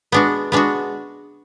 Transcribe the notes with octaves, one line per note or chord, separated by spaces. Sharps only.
G#3 B3 D4 F#4
G#3 B3 D4 F#4